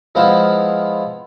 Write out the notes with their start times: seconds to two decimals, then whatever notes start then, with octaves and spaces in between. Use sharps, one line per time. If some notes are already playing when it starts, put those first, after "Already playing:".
0.15 F3 G#3 B3 E4 C5 F5